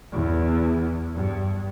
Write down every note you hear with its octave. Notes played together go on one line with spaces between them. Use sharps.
E2
G2